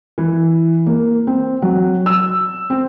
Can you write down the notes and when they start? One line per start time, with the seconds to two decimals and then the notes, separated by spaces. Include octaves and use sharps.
0.18 E3
0.86 A#3
1.27 C4
1.62 F#3
2.06 E6
2.70 C4